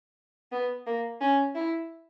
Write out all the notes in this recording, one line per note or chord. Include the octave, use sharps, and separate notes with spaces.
B3
A#3
C#4
E4